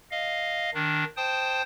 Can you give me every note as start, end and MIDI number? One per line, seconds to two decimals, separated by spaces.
0.11 0.70 75
0.11 0.70 77
0.74 1.04 51
0.74 1.04 62
1.17 1.62 72
1.17 1.62 79
1.17 1.62 81
1.17 1.62 87